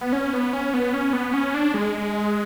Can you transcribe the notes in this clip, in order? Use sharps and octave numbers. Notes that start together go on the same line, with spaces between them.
B3
C#4
B3
C#4
B3
C#4
B3
C#4
D4
G#3